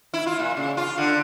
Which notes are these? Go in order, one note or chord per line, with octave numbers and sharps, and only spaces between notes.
E4
F4
A#2
C#3
F4
D3